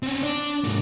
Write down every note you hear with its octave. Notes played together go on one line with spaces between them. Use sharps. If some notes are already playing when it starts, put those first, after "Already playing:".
C4 C#4
D4
G#2 A#3